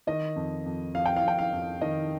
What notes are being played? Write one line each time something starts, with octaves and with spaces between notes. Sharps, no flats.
D#3 D#5
F2
F2
F2 F5
G5
F5
F2 G5
F5
F2
D#3 D#5